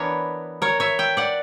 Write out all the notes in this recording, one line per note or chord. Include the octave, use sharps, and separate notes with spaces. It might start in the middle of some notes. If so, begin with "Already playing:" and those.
Already playing: E3 B3 D4 A#4 C#5
A#4 C#5
C#5 E5
E5 G5
D5 F#5